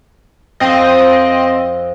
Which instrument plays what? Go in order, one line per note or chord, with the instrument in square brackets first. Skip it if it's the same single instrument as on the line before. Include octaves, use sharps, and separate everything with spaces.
[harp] F2 [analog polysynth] C4 D#5